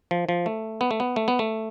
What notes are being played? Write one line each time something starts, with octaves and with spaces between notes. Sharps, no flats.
F3
F3
A3
B3
A3
B3
A3
B3
A3